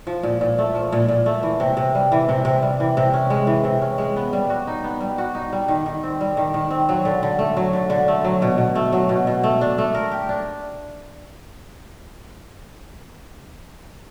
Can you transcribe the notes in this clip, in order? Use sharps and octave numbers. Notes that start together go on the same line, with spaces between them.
F3
A#2
A#2
A3
F3
A#2
A#2
A3
E3
C3
C3
G3
E3
C3
C3
G3
E3
C3
C#4
G#3
E3
C3
C#4
G#3
B3
G3
F#4
D#4
B3
G3
F#4
D#4
G3
D#3
D#3
C4
G3
D#3
D#3
C4
F#3
D3
D3
A3
F#3
D3
D3
A3
F#3
B2
B2
A3
F#3
B2
B2
A3
D4
A3
A#4
G4
D4